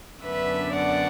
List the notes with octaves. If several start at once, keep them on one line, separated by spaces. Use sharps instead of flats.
F#2 D3 B3 D4 B4 E5
D5 F#5